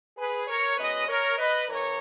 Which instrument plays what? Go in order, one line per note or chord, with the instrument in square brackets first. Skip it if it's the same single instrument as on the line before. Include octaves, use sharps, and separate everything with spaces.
[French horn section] G#4 B4
A#4 C#5
B2 G#3 C#4 B4 D#5
A#4 C#5
B4 D#5
C#3 E3 A#4 C#5